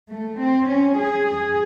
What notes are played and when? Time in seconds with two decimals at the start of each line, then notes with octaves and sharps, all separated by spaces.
0.10 A3
0.39 C4
0.68 C#4
0.98 G#4
1.28 G#4